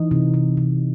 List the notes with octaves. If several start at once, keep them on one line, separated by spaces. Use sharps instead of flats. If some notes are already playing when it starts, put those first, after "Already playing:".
Already playing: E3 D#4
C3
C3
C3